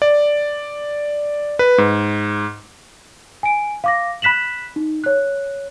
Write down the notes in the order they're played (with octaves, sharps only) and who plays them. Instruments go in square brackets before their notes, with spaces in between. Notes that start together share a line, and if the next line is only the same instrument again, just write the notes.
[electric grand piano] D5
B4
G#2
[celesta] G#5 D7
F5 D6 A#6
B5 F#6 B6 E7 F#7
D#4
C#5 F#6